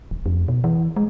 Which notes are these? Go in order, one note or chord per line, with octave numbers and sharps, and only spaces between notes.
D#1
F2
B2
E3
G#3